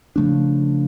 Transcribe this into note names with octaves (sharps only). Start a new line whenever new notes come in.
C#3 F3 A3 D4